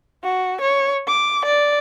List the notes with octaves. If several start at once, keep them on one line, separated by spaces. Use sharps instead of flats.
F#4
C#5
D6
D5